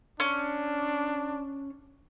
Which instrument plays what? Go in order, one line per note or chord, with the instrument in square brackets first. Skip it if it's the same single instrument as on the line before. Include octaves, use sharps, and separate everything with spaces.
[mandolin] C#4 [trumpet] D4